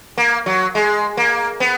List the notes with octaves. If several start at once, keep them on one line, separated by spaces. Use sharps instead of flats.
A#3
F#3
G#3
A#3
B3